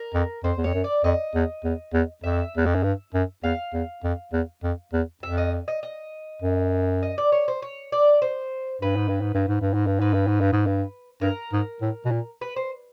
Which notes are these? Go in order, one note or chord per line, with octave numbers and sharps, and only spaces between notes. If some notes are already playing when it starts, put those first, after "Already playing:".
Already playing: A#4
F2
F2 C5
E2
F2 C#5
F#2
D5
F2 D#5
E2
E2
E2
F2 E5
E2
F2
F#2
G2
F#2
E2 F5
E2
F2
E2
F2
E2
F2 E5
D#5
D#5
D#5
F#2
D#5
D5
C#5
C5
C#5
D5
C5
G2 B4
G#2
G2
G#2
G2
G#2
G2
G#2
G2
G#2 B4
G2
G#2
G2
G#2
G2
G2 A#4
G#2
A2
B2
A#2
B4
C5